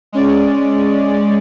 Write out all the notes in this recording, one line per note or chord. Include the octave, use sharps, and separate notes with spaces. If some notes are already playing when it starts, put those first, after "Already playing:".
G#3 C#4 D5